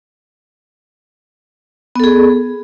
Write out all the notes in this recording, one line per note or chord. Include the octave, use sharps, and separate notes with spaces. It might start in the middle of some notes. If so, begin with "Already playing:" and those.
B3 G#4 A4